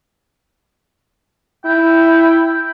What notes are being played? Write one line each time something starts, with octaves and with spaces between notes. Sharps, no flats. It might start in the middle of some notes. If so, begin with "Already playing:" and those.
E4 G5